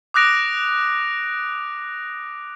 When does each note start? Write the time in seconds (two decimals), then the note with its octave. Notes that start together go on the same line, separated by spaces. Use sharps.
0.14 D6 D#6 F#6 A#6 D7 F7